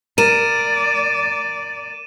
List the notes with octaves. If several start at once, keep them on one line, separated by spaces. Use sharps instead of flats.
A#4 D5 D#7 E7